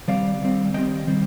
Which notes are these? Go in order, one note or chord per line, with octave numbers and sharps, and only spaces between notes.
D#3 G3 C4 D5 F5
D#3 G3 C4
D#3 G3 C4 D#5 G5
D#3 G3 C4